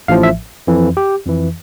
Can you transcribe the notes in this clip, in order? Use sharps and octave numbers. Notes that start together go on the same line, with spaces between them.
A1 A2 F3 F5
E5
F2 E3
G4
F2 E3